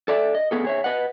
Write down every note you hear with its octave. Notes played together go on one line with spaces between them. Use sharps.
A4 D5 E5
D#5
B3 G#4 A4
G#4 C#5 E5
B4 D#5 F#5